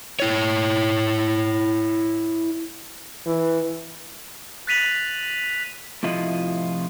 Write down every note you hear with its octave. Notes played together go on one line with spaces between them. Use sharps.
E4 C#5
E3
F#6 A6 B6 D#7 F7 F#7
A2 C3 F3 E4 F4 D#5